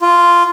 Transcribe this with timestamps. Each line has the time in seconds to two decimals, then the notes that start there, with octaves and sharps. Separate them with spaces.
0.01 F4